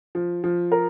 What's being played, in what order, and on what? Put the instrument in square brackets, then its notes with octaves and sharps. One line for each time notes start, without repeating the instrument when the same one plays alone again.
[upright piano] F3
F3
A#4